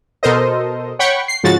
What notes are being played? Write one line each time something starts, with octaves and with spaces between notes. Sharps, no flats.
B2 A4 A#4 C5 D#5
C#5 F#5 G5 B5 C#6
C7
G#2 C#3 F3 F#4 A6